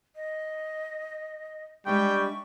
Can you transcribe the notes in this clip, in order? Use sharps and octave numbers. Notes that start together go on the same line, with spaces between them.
D#5
G3 G#3 D4 E5 G5 C#6